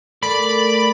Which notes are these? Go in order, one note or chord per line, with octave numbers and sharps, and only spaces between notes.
A3 A4 A#4 D5 B5